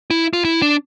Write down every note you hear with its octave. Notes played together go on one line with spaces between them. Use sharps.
E4
F4
E4
D4